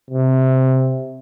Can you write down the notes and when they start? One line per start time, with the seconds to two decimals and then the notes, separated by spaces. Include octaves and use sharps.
0.10 C3